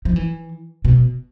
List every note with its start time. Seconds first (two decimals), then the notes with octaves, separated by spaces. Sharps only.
0.05 F3
0.16 E3
0.85 B2